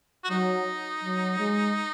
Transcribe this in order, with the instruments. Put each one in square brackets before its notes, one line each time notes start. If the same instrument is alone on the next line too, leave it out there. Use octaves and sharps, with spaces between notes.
[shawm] F#4
[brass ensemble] F#3 [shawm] D#4
[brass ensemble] F#3
G#3